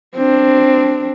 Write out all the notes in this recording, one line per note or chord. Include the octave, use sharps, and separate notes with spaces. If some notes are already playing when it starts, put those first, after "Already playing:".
C4 D4